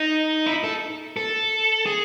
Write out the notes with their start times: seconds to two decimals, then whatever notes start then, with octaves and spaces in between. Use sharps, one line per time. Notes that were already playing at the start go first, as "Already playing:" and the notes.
Already playing: D#4
0.46 E4
0.64 A4
1.17 A4
1.86 G#4